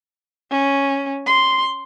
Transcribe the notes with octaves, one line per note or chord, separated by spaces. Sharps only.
C#4
C6